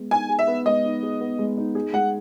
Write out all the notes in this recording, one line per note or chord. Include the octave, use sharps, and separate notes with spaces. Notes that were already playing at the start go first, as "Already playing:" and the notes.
Already playing: G#3 B3
D#4 G#5
G#4
E5
B3
G#3 D#5
D#4
G#4
B3
G#3
D#4
G#4
G#3 F#5